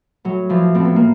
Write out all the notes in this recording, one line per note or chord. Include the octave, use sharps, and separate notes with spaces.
A2 F#3
E3 F3
A2 C4
B3
A#3